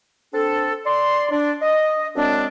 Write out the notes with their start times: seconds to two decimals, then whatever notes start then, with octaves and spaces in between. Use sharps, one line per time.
0.33 C4 D4 A4
0.86 D5 C6
1.32 D4
1.62 D#5
2.15 F#2 G#3 C4 D4